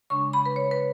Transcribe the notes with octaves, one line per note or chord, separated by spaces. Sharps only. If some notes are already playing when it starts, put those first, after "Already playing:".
C#3 G#3 D4 C#6
B5
B4
C#5
B4